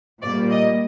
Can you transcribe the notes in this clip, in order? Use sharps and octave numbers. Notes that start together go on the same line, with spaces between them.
A#2 G3 A#3 D5
D#5